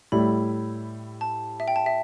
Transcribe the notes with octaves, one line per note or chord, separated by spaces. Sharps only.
A2 G3 E4 B5
A5
E5
G5
A5
E5